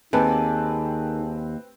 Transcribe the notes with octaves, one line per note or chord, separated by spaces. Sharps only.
D#2 D#3 C4 G#4 B4 G#5 A5